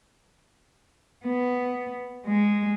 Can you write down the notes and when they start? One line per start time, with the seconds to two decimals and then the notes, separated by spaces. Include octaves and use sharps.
1.25 B3
2.27 G#3